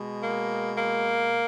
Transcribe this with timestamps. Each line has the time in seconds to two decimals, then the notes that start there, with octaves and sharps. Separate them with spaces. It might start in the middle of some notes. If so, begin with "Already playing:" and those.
Already playing: B2 G#3
0.21 A#3
0.76 A#3